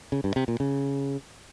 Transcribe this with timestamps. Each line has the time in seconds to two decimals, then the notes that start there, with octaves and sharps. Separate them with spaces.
0.12 C#3
0.24 G2
0.36 C3
0.48 A#2
0.60 C#3